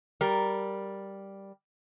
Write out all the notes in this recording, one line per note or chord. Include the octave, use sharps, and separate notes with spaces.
G3 A#4